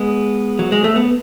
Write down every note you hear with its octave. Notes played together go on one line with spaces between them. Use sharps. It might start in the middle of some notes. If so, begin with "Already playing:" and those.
Already playing: G#3 B3
F#3
G#3
A3
B3